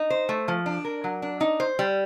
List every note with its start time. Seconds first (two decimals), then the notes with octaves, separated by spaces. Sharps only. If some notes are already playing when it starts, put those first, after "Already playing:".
Already playing: D#4
0.10 C5
0.29 A3
0.48 F3
0.66 D4
0.85 A#4
1.04 F#3
1.22 D4
1.41 D#4
1.60 C5
1.79 G3